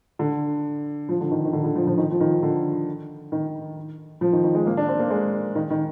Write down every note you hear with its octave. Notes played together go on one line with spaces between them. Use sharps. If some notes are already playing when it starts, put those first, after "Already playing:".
D3
F3
D3
D#3
D#3
D3
D3
F3
F3
D#3
F3
D#3
D3
D#3
F3
D#3
D#3
G#3
A#3
D4
C4
A#3
G#3
D#3
D#3